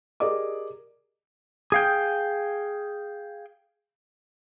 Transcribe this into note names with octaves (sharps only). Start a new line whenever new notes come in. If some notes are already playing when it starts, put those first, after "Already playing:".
G4 G#4 A#4 D5 D#5 D6
G#4 F5 G5